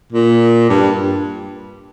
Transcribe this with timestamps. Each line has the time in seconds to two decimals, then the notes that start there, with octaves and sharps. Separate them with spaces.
0.13 A#2
0.69 G2